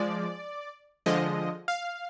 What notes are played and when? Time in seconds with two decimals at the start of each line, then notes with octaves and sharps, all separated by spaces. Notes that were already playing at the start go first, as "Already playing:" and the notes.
Already playing: F3 G#3 D5
1.06 D3 F3 G#3 D#5
1.68 F5